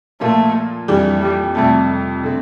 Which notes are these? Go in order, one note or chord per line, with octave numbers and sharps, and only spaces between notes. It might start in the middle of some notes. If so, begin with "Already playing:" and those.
A#2 F3 A3 A#3 F4
F2 E3 G3 D4 G4
G3
F2 C3 G3 A3
D3 A3 C4